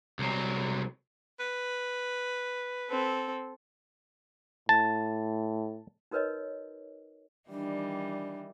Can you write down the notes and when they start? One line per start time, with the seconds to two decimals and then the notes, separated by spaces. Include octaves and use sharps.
0.19 C2 F#3
1.40 B4
2.89 C4 A4
4.69 A2 A5
6.11 D#4 F#4 A#4 B4 C#5 D#5
7.50 D#3 E3 G3 D4